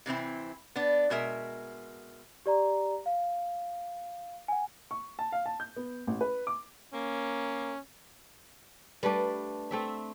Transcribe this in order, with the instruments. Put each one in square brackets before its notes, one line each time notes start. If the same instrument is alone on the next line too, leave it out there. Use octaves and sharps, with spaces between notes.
[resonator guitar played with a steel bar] C3 E3 C4 E4
B3 D4
B2 G#3 A#4 E5
[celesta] G4 D5 A#5
F5
F#5 G#5
[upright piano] C#6
A5
F5
A5
G6
B3
A1
B4
D6
[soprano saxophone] A#3 [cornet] C#4
[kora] G3 A3 D4 [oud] B4
[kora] A3 C4 E5